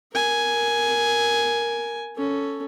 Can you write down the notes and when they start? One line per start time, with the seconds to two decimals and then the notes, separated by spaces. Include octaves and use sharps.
0.13 A#4 G#5
2.16 C#4 A4